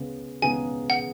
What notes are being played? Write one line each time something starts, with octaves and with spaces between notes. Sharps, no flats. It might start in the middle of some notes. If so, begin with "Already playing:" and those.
Already playing: C#3 G#3 B3
C#3 G#3 B3 D#4 G#4 G#5
F#5